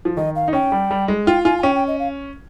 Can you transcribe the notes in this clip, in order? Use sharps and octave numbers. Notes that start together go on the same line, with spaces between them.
F3
D#3 D#5
F5
D#4
C#4 G5
G3
G3
G#3
F4 G5
F4 G#5
G#5
C#4 G5
G5
D#5
F5